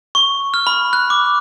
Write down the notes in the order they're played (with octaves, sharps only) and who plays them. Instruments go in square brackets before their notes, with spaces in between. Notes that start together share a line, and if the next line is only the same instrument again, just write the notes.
[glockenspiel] C#6
F6
B5
F#6
D6